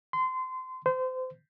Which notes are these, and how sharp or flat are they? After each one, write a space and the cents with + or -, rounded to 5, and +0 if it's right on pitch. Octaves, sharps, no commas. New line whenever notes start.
C6 -25
C5 -30